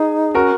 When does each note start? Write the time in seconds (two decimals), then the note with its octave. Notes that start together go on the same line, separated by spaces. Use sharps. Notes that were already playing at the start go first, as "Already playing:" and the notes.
Already playing: D#4 G#4
0.35 C#4 F#4 A#4